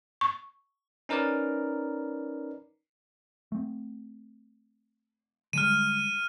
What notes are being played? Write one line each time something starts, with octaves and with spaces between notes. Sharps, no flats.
C#6
C#4 D#4 A#4 B4 D5
A3 C4
D3 G3 G#3 F6 D#7